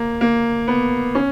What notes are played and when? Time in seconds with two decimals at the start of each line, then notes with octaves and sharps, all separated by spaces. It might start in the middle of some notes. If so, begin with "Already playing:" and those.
Already playing: A#3
0.21 A#3
0.68 B3
1.15 C#4